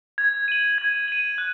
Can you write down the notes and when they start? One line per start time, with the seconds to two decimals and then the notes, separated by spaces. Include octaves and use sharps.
0.18 G#6
0.48 D#7 F#7
0.78 G#6
1.08 D#7 F#7
1.38 F#6